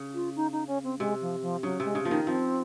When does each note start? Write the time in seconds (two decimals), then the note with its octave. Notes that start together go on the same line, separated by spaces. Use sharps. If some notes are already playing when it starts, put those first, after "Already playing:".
Already playing: C#3
0.14 F4
0.36 D#4
0.52 D#4
0.67 C#4
0.84 C4
0.99 C3 G#3
1.21 F3
1.42 F3
1.63 C#3 F#3
1.80 C3 G#3
1.95 C#3
2.05 F3 A#3
2.11 D#3
2.27 F3 C4